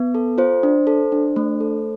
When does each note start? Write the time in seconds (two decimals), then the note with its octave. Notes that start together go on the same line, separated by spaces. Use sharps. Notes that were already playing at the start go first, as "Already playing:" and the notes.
Already playing: B3
0.15 A4
0.38 F4 C5
0.63 D4
0.87 A4
1.12 D4
1.36 A3
1.60 A4